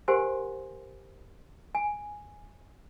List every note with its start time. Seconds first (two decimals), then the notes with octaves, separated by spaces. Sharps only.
0.08 G4 A#4 C5 F#5 G#5 C6
1.75 G#5